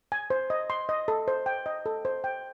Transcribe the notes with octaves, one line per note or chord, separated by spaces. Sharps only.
G#5
C5
D#5
C6
D#5
A4
C5
G5
D#5
A4
C5
G5